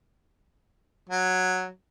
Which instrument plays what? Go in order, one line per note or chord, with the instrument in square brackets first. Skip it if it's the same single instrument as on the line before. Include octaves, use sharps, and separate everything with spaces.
[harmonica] F#3